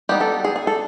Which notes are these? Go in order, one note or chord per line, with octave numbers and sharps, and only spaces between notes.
G3 B3 D#4 G4
A4
G#4
G#4
A4